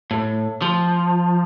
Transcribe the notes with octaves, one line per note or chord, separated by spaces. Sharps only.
A2
F3